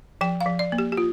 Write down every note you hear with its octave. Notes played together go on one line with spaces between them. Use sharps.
F3 G5
F5
F3
D5
A#3
G4
G4
F4